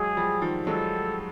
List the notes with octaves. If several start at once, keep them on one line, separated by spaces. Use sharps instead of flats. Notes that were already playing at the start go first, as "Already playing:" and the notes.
Already playing: F#3 G#3 G#4
F3 G3
D#3 F3
F#3 G#3 A4